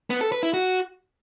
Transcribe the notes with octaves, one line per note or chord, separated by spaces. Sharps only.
B3
A4
B4
E4
F#4